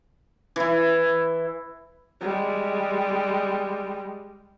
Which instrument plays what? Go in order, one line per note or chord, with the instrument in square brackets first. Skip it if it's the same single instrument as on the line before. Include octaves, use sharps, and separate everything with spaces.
[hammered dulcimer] E3 E4
[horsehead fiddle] G3 G#3